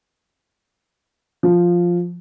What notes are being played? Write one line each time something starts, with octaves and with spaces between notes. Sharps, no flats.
F3